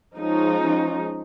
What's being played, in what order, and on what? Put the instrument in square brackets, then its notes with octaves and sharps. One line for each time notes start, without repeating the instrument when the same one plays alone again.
[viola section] F3 G#3 C#4 D#4